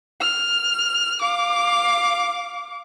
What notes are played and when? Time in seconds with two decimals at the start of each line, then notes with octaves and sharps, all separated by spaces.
0.21 F6
1.22 F5 D6